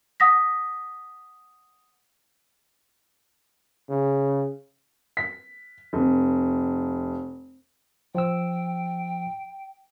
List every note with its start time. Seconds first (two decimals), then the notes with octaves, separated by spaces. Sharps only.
0.20 F#5 D#6 A#6 B6
3.89 C#3
5.17 B6
5.93 F1
8.15 F3 G5 E6